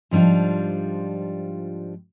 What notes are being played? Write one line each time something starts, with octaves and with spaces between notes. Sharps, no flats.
G#2 F3 G3 D4 F4